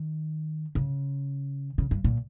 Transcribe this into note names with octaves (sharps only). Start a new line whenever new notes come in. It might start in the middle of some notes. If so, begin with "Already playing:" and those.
Already playing: D#3
C#3
C#3
G2
A#2